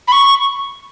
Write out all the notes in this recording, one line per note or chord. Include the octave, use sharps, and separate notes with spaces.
B5
C#6